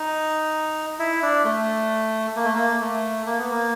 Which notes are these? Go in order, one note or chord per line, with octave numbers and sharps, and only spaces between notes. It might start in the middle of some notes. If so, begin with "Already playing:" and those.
Already playing: D#4
E4
D4
A3
A#3
A3
A#3
A3
A#3
B3
A#3